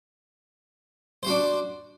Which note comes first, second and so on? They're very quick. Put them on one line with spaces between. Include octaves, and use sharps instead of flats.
C5 F#4 D4